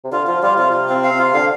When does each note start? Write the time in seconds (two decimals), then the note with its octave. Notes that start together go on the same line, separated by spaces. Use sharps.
0.04 C3
0.11 D3 F4
0.27 F3 F4
0.43 G3 F4
0.57 C3 F4
0.73 F4
0.89 C4
1.04 F5
1.19 F4
1.34 D3 F5